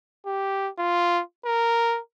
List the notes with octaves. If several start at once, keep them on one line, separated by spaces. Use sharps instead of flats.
G4
F4
A#4